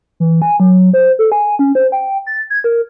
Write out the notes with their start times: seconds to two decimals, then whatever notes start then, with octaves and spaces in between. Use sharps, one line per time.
0.20 E3
0.42 G#5
0.60 F#3
0.94 C5
1.19 A4
1.32 G#5
1.59 C#4
1.75 C5
1.92 G5
2.27 A6
2.50 G#6
2.64 A#4